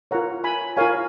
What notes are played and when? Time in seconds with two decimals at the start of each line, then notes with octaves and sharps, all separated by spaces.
0.11 F4 A#4 C#5 F#5 A#5
0.44 G#5 B5
0.77 F4 A#4 C#5 F5 G#5